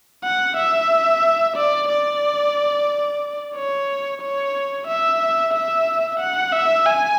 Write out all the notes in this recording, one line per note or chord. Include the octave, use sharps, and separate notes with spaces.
F#5
E5
D5
D5
C#5
C#5
E5
E5
F#5
E5
G#5